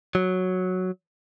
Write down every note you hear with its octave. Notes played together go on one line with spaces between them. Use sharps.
F#3